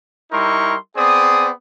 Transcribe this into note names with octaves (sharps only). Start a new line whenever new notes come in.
G3 D#4 E4 A#4 C6 C#6
B3 C4 G#4 D5 D#6